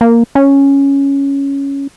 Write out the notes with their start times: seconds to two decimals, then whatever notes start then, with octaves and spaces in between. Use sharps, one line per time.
0.01 A#3
0.35 C#4